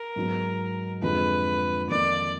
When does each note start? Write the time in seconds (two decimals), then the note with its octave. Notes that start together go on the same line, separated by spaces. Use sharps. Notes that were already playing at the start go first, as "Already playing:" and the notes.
Already playing: A#4
0.16 G#2 F#3 B3
1.02 F2 D3 F3 G#3 B4
1.89 F2 D#3 A#3 D#4 D5